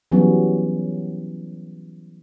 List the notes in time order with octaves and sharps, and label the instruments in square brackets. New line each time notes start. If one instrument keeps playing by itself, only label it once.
[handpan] E3 F#3 G3 B3 C#4 F#4